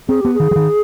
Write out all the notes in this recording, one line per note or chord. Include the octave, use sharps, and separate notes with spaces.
C4 G#4
B3 G4
G#4
D#3
F3
D#3